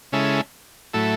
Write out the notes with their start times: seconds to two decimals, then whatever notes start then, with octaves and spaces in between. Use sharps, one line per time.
0.12 C#3 G#3 C#4 E4 A4
0.94 A2 F#3 A3 E4 A4